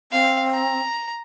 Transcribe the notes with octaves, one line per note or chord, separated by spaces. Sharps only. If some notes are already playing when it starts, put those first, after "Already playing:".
C4 F5
A#5